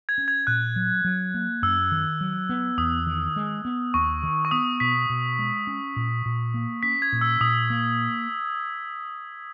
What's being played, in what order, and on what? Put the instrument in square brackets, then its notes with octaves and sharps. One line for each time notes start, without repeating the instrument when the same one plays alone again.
[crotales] G#6
[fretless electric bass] C#4
[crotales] G#6
[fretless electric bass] A#2 [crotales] F#6
[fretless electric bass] F#3
F#3
A#3
[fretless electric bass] F#2 [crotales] E6
[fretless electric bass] D#3
F#3
B3
[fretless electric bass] E2 [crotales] D#6
[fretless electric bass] D#3
G#3
B3
[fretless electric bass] D#2 [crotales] C#6
[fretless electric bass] D#3
[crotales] C#6
[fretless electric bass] B3 [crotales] D#6
[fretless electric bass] B2 [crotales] B6
[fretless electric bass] B2
G#3
C#4
A#2
A#2
A#3
[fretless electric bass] C#4 [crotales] B6
[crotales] G#6
[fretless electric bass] A#2
[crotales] E6
[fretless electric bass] A#2 [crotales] D#6
[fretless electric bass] A#3